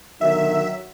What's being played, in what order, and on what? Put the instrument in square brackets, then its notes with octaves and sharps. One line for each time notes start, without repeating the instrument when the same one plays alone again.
[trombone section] B2 D3 D#3 [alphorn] F#3 [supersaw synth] E5